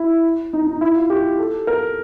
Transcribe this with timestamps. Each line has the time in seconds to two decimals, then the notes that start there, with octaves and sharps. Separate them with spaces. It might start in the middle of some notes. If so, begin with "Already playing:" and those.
Already playing: E4
0.53 D#4
0.67 D#4
0.81 E4
0.96 F4
1.10 G4
1.39 A4
1.67 A#4